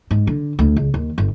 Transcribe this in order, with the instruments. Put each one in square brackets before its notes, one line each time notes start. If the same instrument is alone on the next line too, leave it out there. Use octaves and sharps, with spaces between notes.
[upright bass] G#2
D3
D2
C#2
D#2
G1